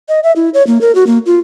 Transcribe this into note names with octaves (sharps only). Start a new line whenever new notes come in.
D#5
E5
E4
C#5
A#3
A#4
F#4
A#3
F4